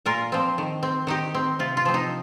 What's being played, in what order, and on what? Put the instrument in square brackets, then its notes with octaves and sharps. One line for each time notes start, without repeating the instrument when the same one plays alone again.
[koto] A#2 F4 A#4
F3 C4
D#3
C4
D#3 D#4 G4
C4
C3 F4
F4
F3 C4
D#4